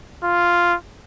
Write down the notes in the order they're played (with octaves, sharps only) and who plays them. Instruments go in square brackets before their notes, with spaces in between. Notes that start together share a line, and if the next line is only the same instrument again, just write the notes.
[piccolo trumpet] F4